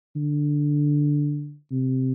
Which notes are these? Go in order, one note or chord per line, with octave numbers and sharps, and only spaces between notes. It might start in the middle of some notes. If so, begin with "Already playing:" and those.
D3
C3